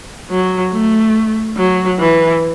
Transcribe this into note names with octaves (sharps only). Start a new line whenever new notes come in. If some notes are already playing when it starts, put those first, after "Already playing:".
F#3
A3
F#3
E3